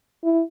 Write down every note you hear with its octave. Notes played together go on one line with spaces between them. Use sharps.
E4